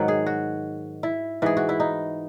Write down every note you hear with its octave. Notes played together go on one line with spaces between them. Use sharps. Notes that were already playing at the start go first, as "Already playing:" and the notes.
Already playing: G#2 D#3 F#3 F#4
G#4
F#4
E4
G#2 E3 G#4
F#4
E4
D#4